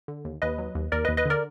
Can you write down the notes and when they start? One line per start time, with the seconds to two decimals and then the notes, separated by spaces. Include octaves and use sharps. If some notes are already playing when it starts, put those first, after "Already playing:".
0.08 D3
0.25 D#2
0.42 D#2 B4 D#5
0.58 F#3
0.75 D#2
0.92 D#2 A#4 D5
1.05 B4 D#5
1.09 D#2
1.17 B4 D#5
1.26 D3 A#4 D5